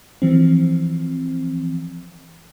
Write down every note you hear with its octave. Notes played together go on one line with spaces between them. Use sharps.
E3 F3 C4